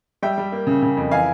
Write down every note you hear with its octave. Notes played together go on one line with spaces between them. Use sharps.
G3 E5 G5
G3
A#3
C#3
C#3
F2
E3 F5 G#5